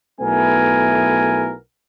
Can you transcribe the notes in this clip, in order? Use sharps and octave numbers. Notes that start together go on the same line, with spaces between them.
B1 A3 B3 E4 A#4 G#5